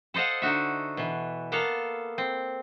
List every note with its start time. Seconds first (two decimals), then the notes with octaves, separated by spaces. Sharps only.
0.14 A4 C5 D#5 F5 F#5
0.42 D3 D#4 F#4 E5
0.97 B2 E3
1.52 A#3 B3 A4 F5 A5 A#5
2.18 C4